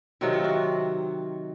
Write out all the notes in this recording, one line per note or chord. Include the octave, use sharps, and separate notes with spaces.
C3 D#3 F#3 C4 F#4
F4
F#4